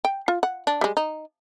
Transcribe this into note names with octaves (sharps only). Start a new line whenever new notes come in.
G5
F4
F#5
D4
G3 G#3
D#4